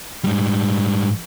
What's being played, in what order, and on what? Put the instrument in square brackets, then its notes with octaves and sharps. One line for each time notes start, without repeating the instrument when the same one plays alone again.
[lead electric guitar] G#2 G3